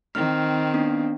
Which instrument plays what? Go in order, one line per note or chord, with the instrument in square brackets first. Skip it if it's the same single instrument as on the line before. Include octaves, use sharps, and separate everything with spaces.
[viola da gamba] D#3 C4 [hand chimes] F6
[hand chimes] B3 D4